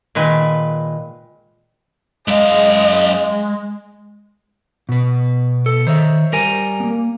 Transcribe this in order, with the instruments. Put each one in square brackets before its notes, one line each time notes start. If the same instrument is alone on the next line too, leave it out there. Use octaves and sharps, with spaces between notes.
[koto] A#2 D#3 G#3 B4
[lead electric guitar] F#2 F5 [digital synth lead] G#3 [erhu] D#5
[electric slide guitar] B2 B4
[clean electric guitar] A4
[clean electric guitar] D#3 [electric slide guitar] C5 C#5 E5
[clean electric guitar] G3 A#4 G#5
[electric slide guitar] A#3 B3